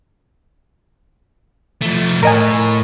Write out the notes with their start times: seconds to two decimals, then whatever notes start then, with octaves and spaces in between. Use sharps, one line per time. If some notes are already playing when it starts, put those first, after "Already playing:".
1.82 F3 A3
2.23 A2 A#4 D#5 G#5